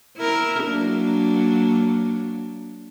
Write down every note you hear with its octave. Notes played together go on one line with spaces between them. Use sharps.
E4 A#4
F#3 A#3 D4